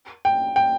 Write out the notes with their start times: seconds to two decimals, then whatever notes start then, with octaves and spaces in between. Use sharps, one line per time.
0.25 G5
0.56 G5